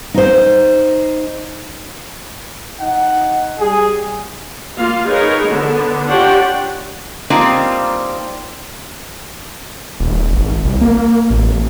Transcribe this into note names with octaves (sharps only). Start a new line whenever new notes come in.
D#4 C5
D#4 F#5
G3 G#4
A#3 F4 F5
D#4 G#4 A#4 B4 C#5
D3 B3
D4 F4 G4 C#5 F#5 G5
G3 A#3 C4 D4 D#4 F4
D#1
G#1
C2
A#3
A1